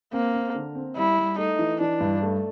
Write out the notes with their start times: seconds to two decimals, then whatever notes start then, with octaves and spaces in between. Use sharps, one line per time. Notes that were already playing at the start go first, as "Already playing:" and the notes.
0.13 A#3 C4
0.34 C4
0.55 D3
0.75 C4
0.96 G3 E4
1.17 G3
1.38 A3 D#4
1.59 E3
1.80 E3 D4
2.00 G2
2.22 A3